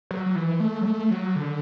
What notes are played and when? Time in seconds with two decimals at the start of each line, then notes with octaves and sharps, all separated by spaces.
0.11 F#3
0.26 F#3
0.36 E3
0.60 A3
0.82 F#3
0.86 A3
1.00 A3
1.11 F#3
1.36 D3